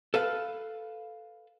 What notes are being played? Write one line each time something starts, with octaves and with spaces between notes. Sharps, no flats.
A4 B4 F5